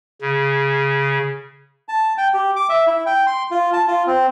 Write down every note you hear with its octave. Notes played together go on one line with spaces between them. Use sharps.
C#3
A5
G5
G4
D6
E5
E4
G5
C6
F4
A5
F4
C4